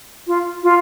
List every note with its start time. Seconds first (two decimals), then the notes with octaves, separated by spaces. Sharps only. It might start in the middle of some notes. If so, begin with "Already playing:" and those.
0.27 F4
0.63 F4